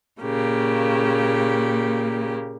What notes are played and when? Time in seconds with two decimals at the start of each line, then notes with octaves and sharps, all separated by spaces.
0.21 A#2 C#3 A#3 G4